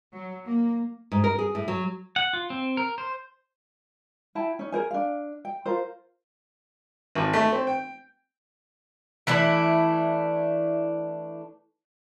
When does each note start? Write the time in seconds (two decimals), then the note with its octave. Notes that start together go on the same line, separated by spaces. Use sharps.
0.13 F#3
0.46 A#3
1.12 G#2
1.24 A#4
1.38 G#4
1.55 A2
1.68 F#3
2.16 F#5
2.33 F4
2.50 C4
2.77 A#4
2.98 C5
4.35 E4 G5 A5
4.59 C#4 D#4
4.72 G#4 A#4 C5 G#5
4.91 D4 F5
5.45 G5
5.66 F4 A#4 C5
7.15 G#1
7.33 A3
7.52 C4
7.67 G5
9.27 E3 A3 D4 E4